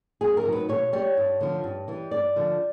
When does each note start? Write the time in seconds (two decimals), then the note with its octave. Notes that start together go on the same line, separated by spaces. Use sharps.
0.21 F#2 G#4
0.37 A#4
0.45 D#3 F#3
0.52 B4
0.69 B2 C#5
0.93 G3 C#5
1.17 G2
1.41 D3 F3
1.64 G2
1.88 E3 G3
2.11 G2 D5
2.36 D3 F3